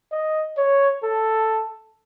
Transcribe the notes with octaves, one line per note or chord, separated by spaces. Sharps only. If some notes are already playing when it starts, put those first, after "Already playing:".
D#5
C#5
A4